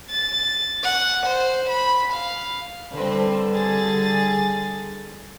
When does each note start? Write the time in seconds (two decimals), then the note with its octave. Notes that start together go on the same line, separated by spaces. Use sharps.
0.10 A6
0.83 F#5
1.26 C5
1.69 B5
2.12 F5
2.94 D3 G3 C4 B4 C5
3.53 G#4 A6